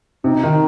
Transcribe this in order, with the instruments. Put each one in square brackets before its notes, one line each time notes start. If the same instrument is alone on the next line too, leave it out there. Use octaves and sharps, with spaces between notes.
[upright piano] C3 [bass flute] D#4
[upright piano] D#3